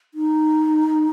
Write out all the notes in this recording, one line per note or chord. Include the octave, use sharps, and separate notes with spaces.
D#4